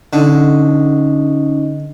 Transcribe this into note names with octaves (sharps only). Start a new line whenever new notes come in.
D3 C#4 D#4 D#5